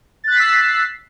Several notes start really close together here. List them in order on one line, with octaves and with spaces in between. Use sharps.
A6 F#6 B6 C7 E6